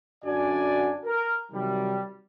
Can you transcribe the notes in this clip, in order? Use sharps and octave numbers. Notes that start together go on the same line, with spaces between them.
F#2 D3 D4 F#4 D5 G#5
A#4
C3 D#3 F#3 G3